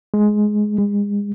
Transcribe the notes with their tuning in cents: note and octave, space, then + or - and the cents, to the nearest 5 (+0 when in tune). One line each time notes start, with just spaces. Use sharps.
G#3 +10
G#3 -35